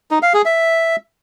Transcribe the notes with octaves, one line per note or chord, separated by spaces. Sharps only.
D#4
F5
G#4
E5